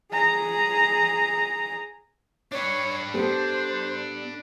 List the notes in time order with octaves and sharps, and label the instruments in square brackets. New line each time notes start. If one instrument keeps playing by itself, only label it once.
[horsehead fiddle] G#4 A#5
[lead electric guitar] D4 B4 [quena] C#5
[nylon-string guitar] B3 G4 A4 [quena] C5